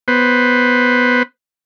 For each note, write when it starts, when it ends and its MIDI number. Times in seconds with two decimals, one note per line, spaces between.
0.08 1.23 59
0.08 1.23 71
0.08 1.23 72